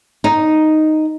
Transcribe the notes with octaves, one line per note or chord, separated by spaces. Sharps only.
D#4